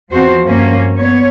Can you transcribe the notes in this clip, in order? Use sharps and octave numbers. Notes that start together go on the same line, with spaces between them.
E2 F3 C4 F#4 C5
G2 A#3 C#4
B3 C#5